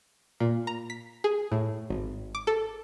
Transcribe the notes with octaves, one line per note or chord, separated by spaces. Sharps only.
A#2
A#5
B6
G#4
A2
G#1
D6
A4